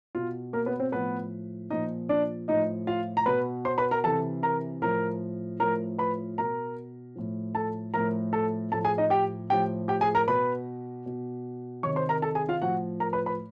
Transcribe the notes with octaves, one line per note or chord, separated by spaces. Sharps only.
B2 F4
A#3 A#4
B3 B4
C4 C5
A2 F3 B3 B4
A#2 F3 D#4 D#5
D4 D5
A2 F3 D#4 D#5
F4 F5
A#5
B2 B4 B5
C5 C6
B4 B5
A#4 A#5
C3 E3 A4 A5
A#4 A#5
A2 F3 A#4 A#5
A2 F3 A#4 A#5
B4 B5
B2 A#4 A#5
A2 F3
A4 A5
A2 F3 A#4 A#5
A4 A5
A2 F3 A4 A5
G#4 G#5
D#4 D#5
G4 G5
A2 F3 G4 G5
G4 G5
G#4 G#5
A#4 A#5
B2 B4 B5
B2
C3 D#3 C#5 C#6
C5 C6
A#4 A#5
A4 A5
G#4 G#5
F4 F5
A2 F3 F#4 F#5
A#4 A#5
B4 B5
B4 B5